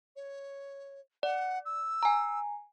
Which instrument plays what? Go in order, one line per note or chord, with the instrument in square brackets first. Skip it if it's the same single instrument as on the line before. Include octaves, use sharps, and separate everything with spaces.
[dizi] C#5
[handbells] D5 [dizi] F#5
[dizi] E6
[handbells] G#5 A#5